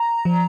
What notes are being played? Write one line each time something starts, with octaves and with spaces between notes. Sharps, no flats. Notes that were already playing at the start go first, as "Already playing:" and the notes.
Already playing: A#5
F3